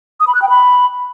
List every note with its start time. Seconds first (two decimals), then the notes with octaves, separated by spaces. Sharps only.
0.20 D#6
0.27 B5
0.35 F#6
0.42 G5
0.49 B5